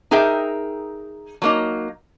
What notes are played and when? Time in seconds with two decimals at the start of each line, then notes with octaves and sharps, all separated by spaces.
0.11 D#4 G#4 A#4 E5 G5
1.42 F#3 A#3 D#4